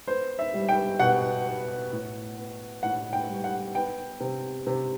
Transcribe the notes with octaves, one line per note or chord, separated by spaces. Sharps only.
B3 C5
E5
G3
G5
B2 F#5
B3
A2
B3
A2 F#5
G5
G3
F#5
B3 G5
C3
C3